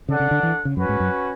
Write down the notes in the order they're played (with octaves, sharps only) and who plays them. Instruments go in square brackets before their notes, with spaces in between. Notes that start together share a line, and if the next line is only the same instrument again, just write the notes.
[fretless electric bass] C#3 [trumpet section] D4 A4 D5 F#5
[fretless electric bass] C#3
D3
E3
C#3
[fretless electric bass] F#2 [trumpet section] C#4 F#4 B4
[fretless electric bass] G#2
F#2